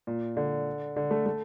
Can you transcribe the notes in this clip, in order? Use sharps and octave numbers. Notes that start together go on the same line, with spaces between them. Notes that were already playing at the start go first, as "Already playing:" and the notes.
A#2
D3
D3
A3
A3